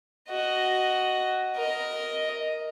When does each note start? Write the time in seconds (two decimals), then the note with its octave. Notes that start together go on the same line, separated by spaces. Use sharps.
0.29 F#4 D#5
1.56 A#4 D#5